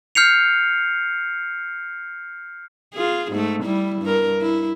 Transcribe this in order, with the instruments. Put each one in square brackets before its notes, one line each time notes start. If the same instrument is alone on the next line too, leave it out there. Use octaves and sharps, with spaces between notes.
[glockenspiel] F6 G6 C7 C#7 F7
[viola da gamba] F4 G#4
G#2 A3
G3 E4
G2 A#4
E4